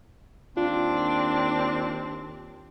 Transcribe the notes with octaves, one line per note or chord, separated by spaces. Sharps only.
D#2 C4 D4 F4